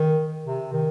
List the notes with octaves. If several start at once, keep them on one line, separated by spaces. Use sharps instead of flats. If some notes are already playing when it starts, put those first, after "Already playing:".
Already playing: D#3
C3
D#3